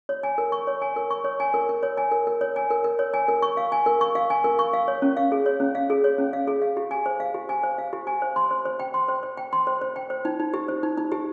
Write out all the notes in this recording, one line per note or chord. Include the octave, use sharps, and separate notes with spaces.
C#5
G#5
A#4
C#6
C#5
G#5
A#4
C#6
C#5
G#5
A#4
A#4
C#5
G#5
A#4
A#4
C#5
G#5
A#4
A#4
C#5
G#5
A#4
C#6
F5
G#5
A#4
C#6
F5
G#5
A#4
C#6
F5
C#5
C#4
F5
G#4
C#5
C#4
F5
G#4
C#5
C#4
F5
G#4
F5
G4
G#5
C5
F5
G4
G#5
C5
F5
G4
G#5
C5
C6
C5
C5
G5
C6
C5
C5
G5
C6
C5
C5
G5
C5
D#4
D#4
G4
C5
D#4
D#4
G4